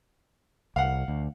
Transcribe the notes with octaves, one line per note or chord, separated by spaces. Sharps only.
C2 F5 F#5
D2